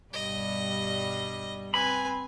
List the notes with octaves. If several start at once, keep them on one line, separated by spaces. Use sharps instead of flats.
G2 B2 G3 D#5
C4 B4 G#5 B5